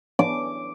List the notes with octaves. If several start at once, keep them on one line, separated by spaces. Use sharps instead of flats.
D6